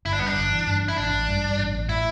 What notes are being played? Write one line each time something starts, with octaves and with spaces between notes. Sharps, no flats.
G1 E4
D4
G2 B3
D4
G1
E3
G2
E3
E4
A1 D4
A1
G2
G2
A1
A1
A2 E4